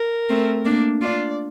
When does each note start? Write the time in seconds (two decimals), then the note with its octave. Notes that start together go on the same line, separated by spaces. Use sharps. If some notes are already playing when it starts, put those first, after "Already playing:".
Already playing: A#4
0.30 A3 C4
0.65 A#3 D4
1.02 D4 F4 D5